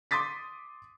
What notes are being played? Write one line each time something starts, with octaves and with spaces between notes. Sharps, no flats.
C6 D6 D#6 A6 B6